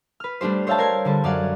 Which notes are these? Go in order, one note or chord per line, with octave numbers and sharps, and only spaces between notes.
B4 F6
G3 A3 D4 G4 C5
C5 C#5 E5 F5 G5 A5
A#4 C6 G#6
D3 G3 A4
F#2 D5 F5 F#5